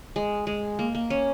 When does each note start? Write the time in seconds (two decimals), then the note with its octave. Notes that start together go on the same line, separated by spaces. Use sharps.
0.16 G#3
0.47 G#3
0.79 A#3
0.95 A#3
1.10 C#4